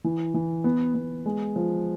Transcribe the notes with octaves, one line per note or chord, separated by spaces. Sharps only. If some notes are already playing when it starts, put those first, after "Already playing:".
E3
E3
B3
B3
G#3
F3